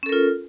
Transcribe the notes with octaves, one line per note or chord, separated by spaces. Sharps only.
C#4 F4 A4 A#4